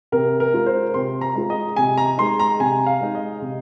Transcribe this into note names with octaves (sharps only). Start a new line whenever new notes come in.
C3 A#4
A#4
G#3 F4
C5
C3 C6
A#5
G#3 F4
D#5
C3 G#5
A#5
G#3 D#4 C6
A#5
C3 G#5
F5
G#3 D#4
D#5
C3